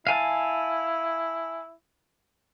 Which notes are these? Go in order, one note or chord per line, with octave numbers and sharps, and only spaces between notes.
E4 F5 G#5 A5